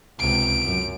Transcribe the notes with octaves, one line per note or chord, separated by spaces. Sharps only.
C#2 C3 D7
F#2